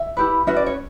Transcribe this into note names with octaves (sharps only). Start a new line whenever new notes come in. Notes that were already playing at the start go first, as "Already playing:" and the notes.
Already playing: E5
E4 G4 B4
C#4 F#4 B4 E5
D5
C#5